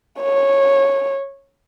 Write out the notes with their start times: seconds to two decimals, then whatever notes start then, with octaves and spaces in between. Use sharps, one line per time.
0.21 C#5